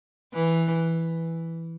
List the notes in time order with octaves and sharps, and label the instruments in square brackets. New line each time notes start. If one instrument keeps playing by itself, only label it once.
[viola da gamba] E3